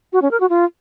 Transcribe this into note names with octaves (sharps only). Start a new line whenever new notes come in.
F#4
C#4
A#4
F#4
F4